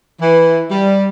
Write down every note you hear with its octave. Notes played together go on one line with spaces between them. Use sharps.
E3
G3